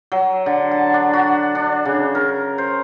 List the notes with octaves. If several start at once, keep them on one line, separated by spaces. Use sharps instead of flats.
F#3
D3
A5
D4
F#4
D4
C#3
A#4
C5